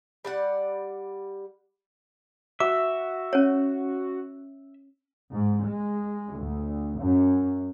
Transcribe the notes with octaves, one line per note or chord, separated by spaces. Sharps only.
G3 D5 F#5
F#4 E5 D6
C#4 C#5
G#2
G#3
D2
F#2